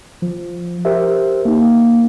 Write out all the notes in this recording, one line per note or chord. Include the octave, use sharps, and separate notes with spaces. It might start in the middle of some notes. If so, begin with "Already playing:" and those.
F3
G4 A#4 C5 E5
A#3 D#4